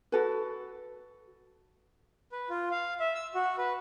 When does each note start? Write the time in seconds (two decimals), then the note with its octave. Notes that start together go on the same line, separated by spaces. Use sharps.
0.12 F#4 A4 B4
2.32 B4
2.50 F4
2.71 F5
3.00 E5
3.15 E6
3.35 F#4
3.58 B4